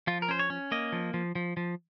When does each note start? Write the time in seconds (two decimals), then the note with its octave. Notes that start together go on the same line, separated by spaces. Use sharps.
0.07 F3 F4
0.22 A#4
0.29 C#4 C5
0.39 C#5
0.50 C#4
0.72 A#3 D#5
0.93 F3
1.14 F3
1.35 F3
1.57 F3